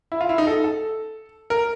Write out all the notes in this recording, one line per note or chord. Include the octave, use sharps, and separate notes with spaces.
E4
F4
E4
D#4
A4
A4
A#4